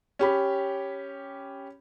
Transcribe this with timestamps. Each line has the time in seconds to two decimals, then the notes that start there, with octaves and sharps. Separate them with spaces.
0.19 C#4 G4 B5